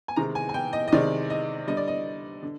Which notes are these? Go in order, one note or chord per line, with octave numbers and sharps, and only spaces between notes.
G#5
C3 D#3 G#3 A#5
G#5
G#5
G5
D#5
D#5
C3 D#3 G#3 D5
D#5
D3 G3 D#5
D5
D#5
D3